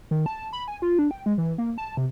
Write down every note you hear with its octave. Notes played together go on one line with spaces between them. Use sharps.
D#3
A5
B5
G#5
F4
D4
G5
G#3
E3
A#3
A5
C3